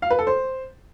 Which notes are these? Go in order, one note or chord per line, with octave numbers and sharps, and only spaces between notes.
F5
B4
A4
C5